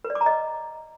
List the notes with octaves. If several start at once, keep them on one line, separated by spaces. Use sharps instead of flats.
B4
D5
D6
A#5
D#5